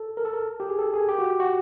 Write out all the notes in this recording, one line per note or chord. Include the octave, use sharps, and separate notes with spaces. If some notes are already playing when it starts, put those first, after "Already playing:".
Already playing: A4
A#4
A4
A#4
G4
G#4
A4
G#4
G4
F#4
G4
F#4